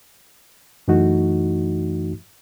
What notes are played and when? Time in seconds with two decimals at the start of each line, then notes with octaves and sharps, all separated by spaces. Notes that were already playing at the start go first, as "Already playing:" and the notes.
0.88 F#2 E3 A3 D#4 F#4